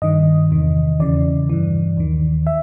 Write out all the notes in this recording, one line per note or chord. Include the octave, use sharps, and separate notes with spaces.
G2 D#3 D#5
E2 C3 D#3
E2 C#3 E3 D5
G2 E3
D#2 D#3
E5